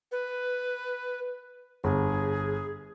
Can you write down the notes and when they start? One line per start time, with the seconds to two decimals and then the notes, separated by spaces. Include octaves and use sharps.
0.12 B4
1.84 G1 G#4